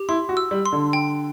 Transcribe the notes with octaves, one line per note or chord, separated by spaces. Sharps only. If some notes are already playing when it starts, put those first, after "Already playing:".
Already playing: G4
E4 C6
F#4
E6
G3
C6
D3
G5